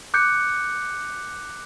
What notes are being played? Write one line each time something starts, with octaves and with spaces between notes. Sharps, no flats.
D6 F#6 G6 C#7